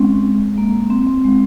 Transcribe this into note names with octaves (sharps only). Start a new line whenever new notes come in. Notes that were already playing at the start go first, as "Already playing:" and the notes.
Already playing: G#3 C4 C#4
A#3
C4
C4
G#3